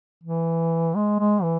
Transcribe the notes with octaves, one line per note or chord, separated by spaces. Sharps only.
E3
G#3
G#3
E3